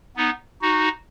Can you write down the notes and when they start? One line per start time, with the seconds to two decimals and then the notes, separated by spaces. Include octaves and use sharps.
0.17 B3 D#4
0.62 D#4 F#4